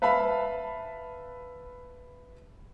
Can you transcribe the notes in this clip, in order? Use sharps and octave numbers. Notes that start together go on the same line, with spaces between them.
B4 E5 F5 A5 B5